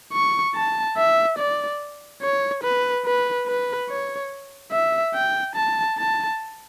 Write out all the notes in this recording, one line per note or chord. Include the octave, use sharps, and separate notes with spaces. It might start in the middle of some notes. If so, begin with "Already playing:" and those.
C#6
A5
E5
D5
C#5
B4
B4
B4
C#5
E5
G5
A5
A5